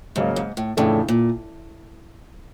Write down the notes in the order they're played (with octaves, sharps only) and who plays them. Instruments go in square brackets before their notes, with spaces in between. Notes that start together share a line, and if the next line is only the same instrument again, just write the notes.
[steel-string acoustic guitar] G#2 [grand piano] C#3 F#3 A#3
[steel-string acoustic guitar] G#2
A2
[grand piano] F2 C#3 E3 A3 D4 [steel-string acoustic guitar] A2
[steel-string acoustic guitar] A#2